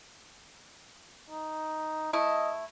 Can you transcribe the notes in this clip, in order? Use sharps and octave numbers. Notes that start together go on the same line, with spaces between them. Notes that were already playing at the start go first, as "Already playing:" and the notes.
D#4
A3 E4 D#5